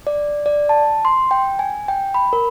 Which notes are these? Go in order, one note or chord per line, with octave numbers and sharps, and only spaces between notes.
D5
D5
A5
C6
G5
G#5
G5
B5
A#4